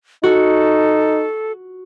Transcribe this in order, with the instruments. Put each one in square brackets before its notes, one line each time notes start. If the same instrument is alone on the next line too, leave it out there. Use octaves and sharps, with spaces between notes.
[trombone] D#4 [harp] F#4 [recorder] A4